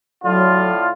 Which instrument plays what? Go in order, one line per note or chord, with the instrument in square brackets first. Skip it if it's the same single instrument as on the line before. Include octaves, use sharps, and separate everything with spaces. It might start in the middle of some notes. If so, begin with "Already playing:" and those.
[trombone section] A2 D3 F4 [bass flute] F#3